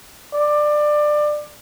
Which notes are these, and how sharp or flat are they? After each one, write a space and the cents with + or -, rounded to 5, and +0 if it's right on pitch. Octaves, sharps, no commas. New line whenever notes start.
D5 +20